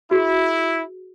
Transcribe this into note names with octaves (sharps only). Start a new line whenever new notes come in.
E4 F#4 G#4